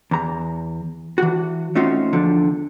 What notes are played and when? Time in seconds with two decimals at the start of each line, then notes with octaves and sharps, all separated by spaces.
0.11 E2 A#5
1.18 E3 F#4
1.75 A3 C4 C#4 D#4 F4 F#4
2.13 E2 D3 F3